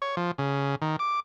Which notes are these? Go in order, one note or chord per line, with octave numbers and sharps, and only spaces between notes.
C#5
F3
C#3
D#3
D6